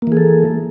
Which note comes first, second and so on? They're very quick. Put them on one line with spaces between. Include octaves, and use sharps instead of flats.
A#3 E3 G#4 A4